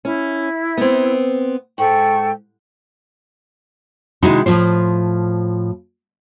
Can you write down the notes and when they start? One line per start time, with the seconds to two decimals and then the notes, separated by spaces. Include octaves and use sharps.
0.05 C#4 E4
0.77 B3 C4
1.78 G#2 A4 G5 C#6
4.22 C3 D#3 G#3 D#4 E4 F#4
4.46 A2 F3 F4 C5